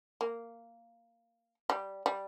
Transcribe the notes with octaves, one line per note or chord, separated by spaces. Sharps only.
A#3
G3
G3